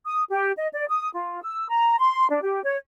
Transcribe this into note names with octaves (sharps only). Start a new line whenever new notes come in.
D#6
G4
D#5
D5
D#6
F4
E6
A#5
C6
D4
G4
C#5